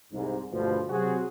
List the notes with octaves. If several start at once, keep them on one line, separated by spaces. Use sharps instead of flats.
C2 G#2
D2 G2 B2 F3
C3 F#3 C4 F#4 G#4